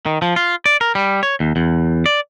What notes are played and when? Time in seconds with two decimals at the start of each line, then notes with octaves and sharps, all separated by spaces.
0.06 D#3
0.22 F3
0.36 F4
0.66 D5
0.81 A#4
0.95 G3
1.23 C#5
1.40 D#2
1.56 E2
2.06 D5